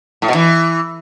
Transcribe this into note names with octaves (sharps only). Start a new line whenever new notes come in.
A2
B2
E3